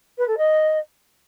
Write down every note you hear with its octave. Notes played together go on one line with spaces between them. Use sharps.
B4
A4
D#5